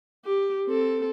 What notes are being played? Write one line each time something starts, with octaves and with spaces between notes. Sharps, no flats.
G4
C4 A4